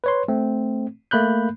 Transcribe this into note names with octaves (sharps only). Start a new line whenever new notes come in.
B4 C#5 C6
A3 C4
A3 A#3 B5 F#6 G6